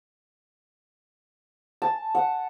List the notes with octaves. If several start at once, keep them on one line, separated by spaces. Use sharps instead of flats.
A5
F#5